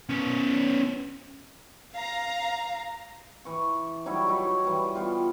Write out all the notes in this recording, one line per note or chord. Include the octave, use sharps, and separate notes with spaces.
B3 C#4
F5 A#5
E3 C#6
F#3 G3 D#4 E4
F#3 D#4 E4
E3 G3
G3 B3 F4